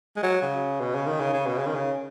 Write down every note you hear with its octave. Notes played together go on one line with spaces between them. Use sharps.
G#3
F#3
C#3
B2
C#3
D#3
C#3
C#3
B2
C#3
D#3
C#3